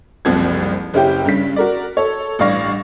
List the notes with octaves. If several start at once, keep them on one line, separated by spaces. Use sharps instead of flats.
F#1 C2 F3 C4 G#6
F#1 C#3 C#4 E4 G4 G5
G2 C#3 B6
F#4 A#4 D5
A4 C#5
A1 G2 D5 F5 C#6 A#6